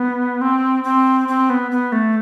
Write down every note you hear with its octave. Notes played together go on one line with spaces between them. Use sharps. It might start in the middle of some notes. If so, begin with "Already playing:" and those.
Already playing: B3
C4
C4
C4
B3
B3
A3